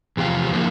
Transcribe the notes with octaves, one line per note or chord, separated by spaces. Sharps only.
E2 C3 F3 C4 F4
D3 F3 A#3 E4